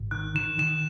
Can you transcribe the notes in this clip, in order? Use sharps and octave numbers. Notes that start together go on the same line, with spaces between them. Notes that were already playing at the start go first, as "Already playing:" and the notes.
Already playing: G#1
D#3 F#6
D#3 E7
D#3 E7